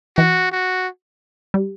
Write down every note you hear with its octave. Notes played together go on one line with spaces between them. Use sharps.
E3 F#4
F#4
G3